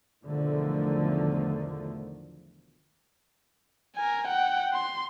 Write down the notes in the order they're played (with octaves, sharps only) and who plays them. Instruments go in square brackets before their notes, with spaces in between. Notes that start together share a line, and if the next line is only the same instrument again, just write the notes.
[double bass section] B1 E2 D3 D#3 F3 A3
[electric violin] A#4 G#5
F#5 G5
C6